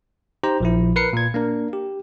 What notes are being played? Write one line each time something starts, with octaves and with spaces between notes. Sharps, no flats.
D#4 G4 C5 A#5
A#1 F3 E4
A#4 B4 C7 C#7
A#2 G#6
A#3 D4 A#4
G4